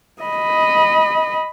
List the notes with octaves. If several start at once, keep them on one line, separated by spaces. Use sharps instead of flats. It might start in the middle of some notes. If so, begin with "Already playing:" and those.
D#5 B5